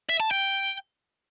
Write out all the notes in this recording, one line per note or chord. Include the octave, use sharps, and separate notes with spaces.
E5
A5
G5